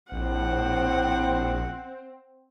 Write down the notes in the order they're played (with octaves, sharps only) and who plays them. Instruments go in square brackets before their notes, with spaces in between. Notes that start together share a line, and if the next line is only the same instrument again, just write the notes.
[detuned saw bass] A#1 [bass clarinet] A2 [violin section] C4 [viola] F#5